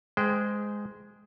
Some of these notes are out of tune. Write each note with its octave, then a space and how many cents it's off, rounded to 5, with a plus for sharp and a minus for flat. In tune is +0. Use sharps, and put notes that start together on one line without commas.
G#3 +0 C5 -30 G5 +0